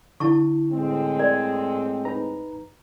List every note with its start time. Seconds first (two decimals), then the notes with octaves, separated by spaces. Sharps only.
0.20 D3 E4 A5 C#6
0.71 A2 G#3 C4
1.19 A#4 D5
2.05 D#4 B4 A#5